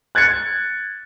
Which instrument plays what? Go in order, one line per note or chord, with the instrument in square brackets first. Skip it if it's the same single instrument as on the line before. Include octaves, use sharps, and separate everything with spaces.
[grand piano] F#6 G#6 A6 C#7